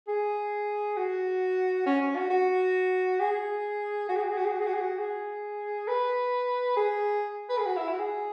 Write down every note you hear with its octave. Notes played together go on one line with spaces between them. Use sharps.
G#4
F#4
C#4
C#4
F#4
F#4
G#4
F#4
G#4
F#4
G#4
F#4
G#4
F#4
G#4
F#4
G#4
F#4
G#4
B4
G#4
B4
G#4
F#4
E4
F#4
G#4